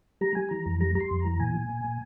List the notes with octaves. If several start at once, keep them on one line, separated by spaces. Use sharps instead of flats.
G3 A#5
G3 G#5
E3 A#5
F2
G3 A#5
G3 A#5
C6
F2
A#5
E3
A#2 G#5
A#2
A#2
A#2